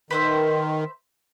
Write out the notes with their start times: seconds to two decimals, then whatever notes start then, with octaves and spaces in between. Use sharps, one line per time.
0.11 D#3 B4 C5 E5